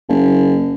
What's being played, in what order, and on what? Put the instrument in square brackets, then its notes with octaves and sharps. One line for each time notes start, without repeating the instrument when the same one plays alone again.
[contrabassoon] F#1